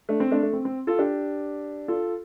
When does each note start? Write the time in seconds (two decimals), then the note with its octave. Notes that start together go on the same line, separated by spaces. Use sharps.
0.09 A3 D4
0.20 C4
0.31 A3 D4
0.43 A3
0.53 C4
0.65 C4
0.87 F4 A4
0.99 D4 G4
1.88 F4 A4